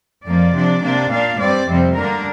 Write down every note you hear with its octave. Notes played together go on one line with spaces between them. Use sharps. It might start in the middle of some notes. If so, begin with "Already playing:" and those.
F2 F3 A#3 D5
C3 F3 D4
C3 A#3 D4
A#2 A#3 D4 F5
G2 G3 C4 D5
F2 C3 G3 C4
G2 D3 G3 A#3 D4 A#4